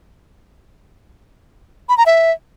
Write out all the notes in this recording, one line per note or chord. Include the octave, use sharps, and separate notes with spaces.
B5
A#5
E5